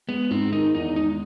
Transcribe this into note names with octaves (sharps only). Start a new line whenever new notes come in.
G#3 B3
G#2 C4
D#3 D#4
E2 D#4
G#3 D#4